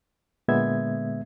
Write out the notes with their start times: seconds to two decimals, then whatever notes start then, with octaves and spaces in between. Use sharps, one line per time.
0.48 A#2 D3 G#3 B3 E5 G#6